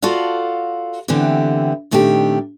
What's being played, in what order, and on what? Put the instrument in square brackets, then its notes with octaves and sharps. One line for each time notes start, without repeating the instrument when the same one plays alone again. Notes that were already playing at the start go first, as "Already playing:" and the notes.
[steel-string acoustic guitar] F4 F#4 A4 D5 F5
D3 E3 A3 B3 C4 G4
A#2 D#3 A3 C4 D4 G4